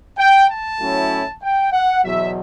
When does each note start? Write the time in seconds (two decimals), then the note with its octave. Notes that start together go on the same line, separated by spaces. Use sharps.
0.18 G5
0.49 A5
0.80 A2 F#3 C#4 E4
1.42 G5
1.72 F#5
2.03 E2 B2 F#3 E5